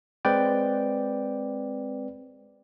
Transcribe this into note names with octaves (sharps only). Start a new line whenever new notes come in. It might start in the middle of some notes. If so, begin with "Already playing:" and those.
G#3 C4 B4 D5 G5